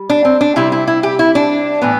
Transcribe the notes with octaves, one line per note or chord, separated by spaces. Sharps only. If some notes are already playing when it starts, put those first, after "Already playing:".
Already playing: G3
D4
C4
D4
C3 G3 C4 E4
E4
E4
G4
E4
D4
A2 E3 B3